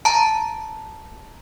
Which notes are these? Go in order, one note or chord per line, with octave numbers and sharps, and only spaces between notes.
A5 A#5